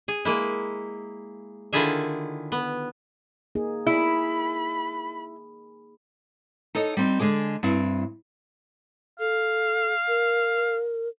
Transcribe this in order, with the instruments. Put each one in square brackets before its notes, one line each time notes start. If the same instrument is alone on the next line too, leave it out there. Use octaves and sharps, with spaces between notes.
[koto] G#4
G#3 A#3 E4
D3 D#3 E4 F4 G#4 E5
B3
[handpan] A#3 D#4 G#4
[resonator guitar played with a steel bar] E4 [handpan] G#4 [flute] B5
[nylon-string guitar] D#4 A4 C#5 D#5
G3 C4 D#4
D3 G#3 G#4 D5
G2 C4 E4
[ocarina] A4 [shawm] F5
[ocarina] A#4